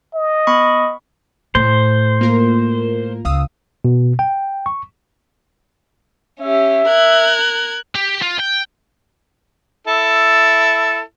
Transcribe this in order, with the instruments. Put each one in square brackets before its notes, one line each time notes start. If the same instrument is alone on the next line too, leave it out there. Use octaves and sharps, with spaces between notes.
[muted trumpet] D#5
[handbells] B3 B5 C#6
[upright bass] A2 [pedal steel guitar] C5
[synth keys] A#3 F4 A#4
[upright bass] C#2 [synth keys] F5 D#6 E6
[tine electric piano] B2
G5
C#6
[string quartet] C#4 G4 [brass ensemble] E5
[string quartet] A#4 F#6 G#6
[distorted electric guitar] G4
F4
G5
[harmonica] E4 A4